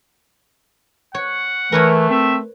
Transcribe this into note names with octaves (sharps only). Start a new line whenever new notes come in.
C#5 F#5
E3 A3 A#4 B4 C#5
C4 E5